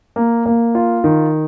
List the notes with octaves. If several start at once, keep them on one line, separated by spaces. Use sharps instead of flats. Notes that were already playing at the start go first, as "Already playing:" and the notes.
A#3
A#3
F4
D#3